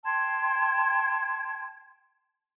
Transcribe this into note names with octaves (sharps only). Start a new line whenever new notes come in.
G5 A5 C6 G#6